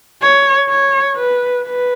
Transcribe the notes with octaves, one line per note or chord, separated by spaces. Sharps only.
C#5
C#5
B4
B4